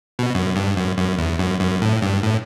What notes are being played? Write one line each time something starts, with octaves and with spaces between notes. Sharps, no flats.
B2
F#2
G2
F#2
F#2
E2
F#2
F#2
A2
G2
A2